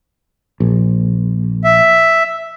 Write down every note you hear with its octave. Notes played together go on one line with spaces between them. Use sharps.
A#1
E5